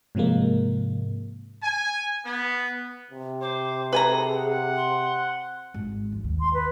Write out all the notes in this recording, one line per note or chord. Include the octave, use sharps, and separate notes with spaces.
G#2 C3 F3 G#3 A#3
G#5
B3
C3
C5 D6
G#4 A4 B4 G#5 A#5
F#5
C6
G#1
F2
D#2
C6
B4